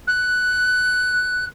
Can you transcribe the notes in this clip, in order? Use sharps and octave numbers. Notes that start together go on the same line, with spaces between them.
F#6